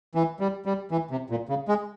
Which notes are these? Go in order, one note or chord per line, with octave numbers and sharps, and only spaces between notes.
E3
G3
G3
E3
C3
A#2
C#3
G#3